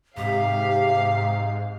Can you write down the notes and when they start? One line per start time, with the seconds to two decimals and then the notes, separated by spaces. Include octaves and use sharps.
0.17 G#2 C3 G4 F5